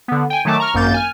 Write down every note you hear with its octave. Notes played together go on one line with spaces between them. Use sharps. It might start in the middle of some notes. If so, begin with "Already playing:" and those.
D3 B3
G5 G#5
D#3 F#3 A3 A5 D6
A#5 C#6 F6
G#1 F#2 A#3 G6 A6
G#5 F6